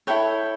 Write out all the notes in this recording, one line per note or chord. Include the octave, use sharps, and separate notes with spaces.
E4 A4 C#5 G5